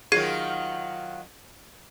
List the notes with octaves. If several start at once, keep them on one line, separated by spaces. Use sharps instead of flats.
D#3 F#3 F4 G#4 G#6 C7